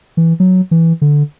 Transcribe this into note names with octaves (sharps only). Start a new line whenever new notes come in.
E3
F#3
E3
D3